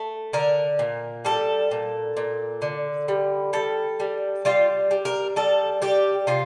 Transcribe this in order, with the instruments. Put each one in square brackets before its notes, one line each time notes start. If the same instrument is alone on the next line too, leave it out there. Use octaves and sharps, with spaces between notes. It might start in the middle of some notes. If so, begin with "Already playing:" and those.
Already playing: [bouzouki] A3
D3 A#4
A#2
G3 A4
A#2
A#2
D3
G3
G3 A4
G3
G3 F4
G3
A#4
G3 A4
G3 G4
C3 F4